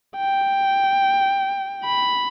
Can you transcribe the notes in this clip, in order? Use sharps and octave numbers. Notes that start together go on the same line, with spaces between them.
G5
B5